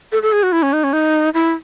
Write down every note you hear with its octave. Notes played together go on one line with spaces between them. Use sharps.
A4
A4
G#4
F#4
E4
C#4
D#4
C#4
D#4
E4